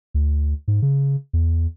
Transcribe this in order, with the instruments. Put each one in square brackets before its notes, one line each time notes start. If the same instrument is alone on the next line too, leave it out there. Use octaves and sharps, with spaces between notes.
[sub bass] D2
G#2
C#3
E2